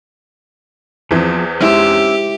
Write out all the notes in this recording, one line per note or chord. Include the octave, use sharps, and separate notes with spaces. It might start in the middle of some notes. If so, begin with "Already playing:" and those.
E2 E3 F3 C4
G#3 C#4 E4 G4 C5 E5